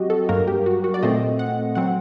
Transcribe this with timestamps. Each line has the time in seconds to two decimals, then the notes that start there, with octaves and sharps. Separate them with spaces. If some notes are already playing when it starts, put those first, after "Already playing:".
Already playing: F#3 C4 F#4 G4 D#5
0.10 A4
0.29 G2 F#3 A#3 A#4
0.47 G4
0.66 F#4
0.84 F#4
0.94 D5
1.03 A#2 A3 C4 D#5
1.39 F#5
1.75 F#3 C4 F#5